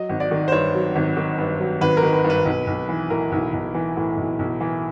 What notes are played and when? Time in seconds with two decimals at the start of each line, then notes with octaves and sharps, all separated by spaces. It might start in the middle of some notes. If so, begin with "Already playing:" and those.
Already playing: F#3 D#5
0.09 G#1
0.20 D5
0.31 D#3
0.48 C5
0.52 G2 C#5
0.74 F#3
0.96 G#1
1.17 D#3
1.38 G2
1.60 F#3
1.81 G#1 B4
1.97 A#4
2.03 D#3
2.13 B4
2.24 G2
2.30 B4
2.45 B1
2.67 B1
2.89 E3
3.10 A2 A#4
3.32 B1
3.53 B1
3.74 E3
3.96 A2
4.17 B1
4.39 B1
4.60 E3